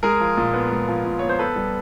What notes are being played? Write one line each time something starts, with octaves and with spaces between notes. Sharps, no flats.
G#3 G#4 A#4
F3
A#2
B3
G#3
F3
A#2
B3 C#5
C5
B3 A4 B4
G3